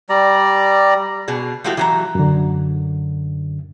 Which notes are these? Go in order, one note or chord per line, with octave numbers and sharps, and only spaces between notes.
G3 D5 A#5
B2 G#4
F3 G#3 A3 E4 F#4 G4
E3 F#3 A#5
F#2 D3